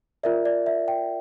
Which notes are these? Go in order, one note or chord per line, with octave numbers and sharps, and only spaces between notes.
F4 A#4 D5 E5
D5
E5
G5